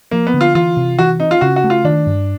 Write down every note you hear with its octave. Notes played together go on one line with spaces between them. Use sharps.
F3 A#3
B3
D3
F4
E3 F4
C3
E3 F#4
C4 D#4
F4
C#3 F#4
F#4
A3
F4
D#3 D4
G2